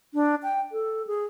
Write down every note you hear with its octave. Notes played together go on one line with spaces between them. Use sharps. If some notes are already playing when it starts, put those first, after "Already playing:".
D4
G5
A4
G#4